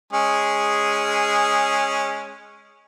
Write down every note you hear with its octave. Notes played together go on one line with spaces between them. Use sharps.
G#3 C#4 G#4